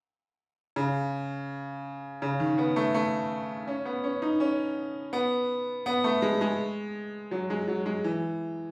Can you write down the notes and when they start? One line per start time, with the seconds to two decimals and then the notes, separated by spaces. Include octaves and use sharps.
0.76 C#3
2.22 C#3
2.40 D#3
2.58 B3
2.76 A3
2.94 A3
3.67 C#4
3.85 B3
4.04 C#4
4.22 D#4
4.40 C#4
5.13 B3
5.86 B3
6.04 A3
6.22 G#3
6.41 G#3
7.31 F#3
7.50 G#3
7.68 F#3
7.86 G#3
8.04 E3